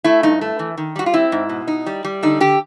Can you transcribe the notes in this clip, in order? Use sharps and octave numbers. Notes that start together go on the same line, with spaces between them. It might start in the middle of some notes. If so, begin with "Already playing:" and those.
A3 E4
G2 D#4
A3
E3
D#3
G3 F#4
F4
C4 E4
G#2
B2
D#4
G3
G3
D3 D#4
D3 G4